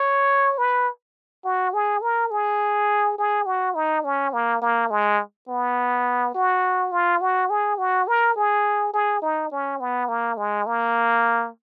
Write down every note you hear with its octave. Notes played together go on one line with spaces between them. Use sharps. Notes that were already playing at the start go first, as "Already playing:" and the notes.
Already playing: C#5
B4
F#4
G#4
A#4
G#4
G#4
F#4
D#4
C#4
A#3
A#3
G#3
B3
F#4
F4
F#4
G#4
F#4
A#4
G#4
G#4
D#4
C#4
B3
A#3
G#3
A#3